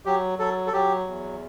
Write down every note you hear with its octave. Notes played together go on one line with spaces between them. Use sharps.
F#3 G4
F#3 A4
A4
F#3 G4
E2